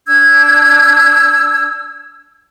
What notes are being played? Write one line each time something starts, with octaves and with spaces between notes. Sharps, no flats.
D4 E6 G#6